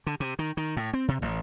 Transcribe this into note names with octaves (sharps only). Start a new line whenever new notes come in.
D3
C3
D#3
D#3
A2
C4
C3
A1